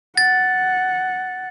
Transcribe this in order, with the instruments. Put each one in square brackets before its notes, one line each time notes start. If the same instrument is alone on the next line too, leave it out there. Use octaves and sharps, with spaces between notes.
[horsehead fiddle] F#5 [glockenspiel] A6